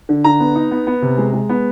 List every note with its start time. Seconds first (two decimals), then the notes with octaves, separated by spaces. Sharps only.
0.09 D3
0.24 D3 A#5
0.40 B3
0.55 D#4
0.71 B3
0.87 B3
1.02 C3
1.18 G#3
1.33 G#3
1.49 B3